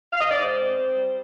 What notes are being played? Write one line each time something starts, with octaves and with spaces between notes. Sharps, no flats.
F5
D#5
D5
G#2 C5
C4
C4
G3